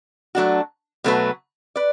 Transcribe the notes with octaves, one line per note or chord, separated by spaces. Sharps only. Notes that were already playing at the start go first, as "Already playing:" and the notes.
F#3 A3 D4 F#4
B2 F#3 A3 F#4 B4
B4 D5